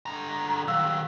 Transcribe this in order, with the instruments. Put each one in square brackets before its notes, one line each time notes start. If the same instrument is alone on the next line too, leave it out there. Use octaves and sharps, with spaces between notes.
[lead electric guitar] D3 A#5
[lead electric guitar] D#3 F#3 [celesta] F5 E6